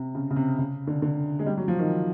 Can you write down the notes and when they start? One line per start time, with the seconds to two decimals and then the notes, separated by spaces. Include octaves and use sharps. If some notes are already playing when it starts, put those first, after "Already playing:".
Already playing: C3
0.15 C#3
0.31 C#3
0.36 C3
0.58 C#3
0.87 D3
1.02 D3
1.39 G#3
1.46 G3
1.57 F#3
1.68 F3
1.79 D#3